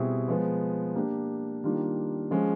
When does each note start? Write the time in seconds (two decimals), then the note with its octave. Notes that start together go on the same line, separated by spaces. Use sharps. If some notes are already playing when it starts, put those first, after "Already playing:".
Already playing: B2 G3 C4 E4 G#4
0.28 F3 G#3 B3
0.95 A#3 D4 G4
1.64 D#3 G3 A#3 D4 F4
2.31 F3 G#3 C#4